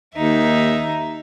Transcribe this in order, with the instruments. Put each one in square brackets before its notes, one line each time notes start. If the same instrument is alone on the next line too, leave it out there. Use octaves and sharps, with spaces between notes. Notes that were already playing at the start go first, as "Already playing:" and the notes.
[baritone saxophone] D#2 [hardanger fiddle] D#4 E5